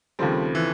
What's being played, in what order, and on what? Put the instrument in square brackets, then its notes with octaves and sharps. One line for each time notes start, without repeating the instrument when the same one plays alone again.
[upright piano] D#2 C#3 F3 A3 C4 [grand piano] G3
[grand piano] E3